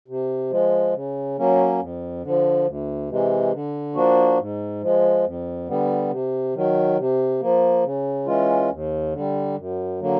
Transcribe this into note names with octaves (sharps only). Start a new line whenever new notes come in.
C3
F3 G#3
C#3
F#3 A#3 C#4
F2
D3 F3
D2
C3 E3 G#3
D3
F3 A#3 D4 F#4
G#2
F3 G#3
F2
D3 G3 B3
C3
D#3 F#3
C3
F3 A#3
C#3
E3 G#3 C#4 F4
D#2
D3 G3
F#2
D3 F#3 A#3